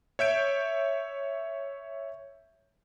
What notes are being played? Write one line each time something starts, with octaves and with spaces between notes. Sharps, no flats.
C#5 E5 G6 D7